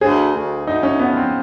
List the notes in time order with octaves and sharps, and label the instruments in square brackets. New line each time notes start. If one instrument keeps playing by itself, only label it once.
[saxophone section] D2 [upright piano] G#4
[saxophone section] D2
[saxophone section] D2 [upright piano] D#4
[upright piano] C#4
[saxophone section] F3 [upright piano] B3
[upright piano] C4